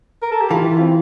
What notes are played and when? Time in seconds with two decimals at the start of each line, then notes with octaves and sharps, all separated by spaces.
0.22 A#4
0.31 A4
0.41 G4
0.50 E3 F4
0.79 C4